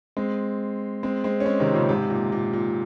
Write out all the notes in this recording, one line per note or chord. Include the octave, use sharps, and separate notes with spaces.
G#3 C4
G#3 C4
G#3 C4
C#4
G#3 C4
C3 D#3
A#2 C#3
G#2 C3
A#2
A#2
A#2